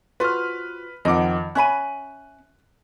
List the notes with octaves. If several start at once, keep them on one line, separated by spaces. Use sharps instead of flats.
F4 F#4 B4 C5 F6
F2 D#3 D#5 F#5 D6
C#4 E5 B5 F#6 D#7